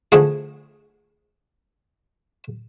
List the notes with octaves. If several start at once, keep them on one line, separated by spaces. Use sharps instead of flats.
D3 F3 A3 E4 G#4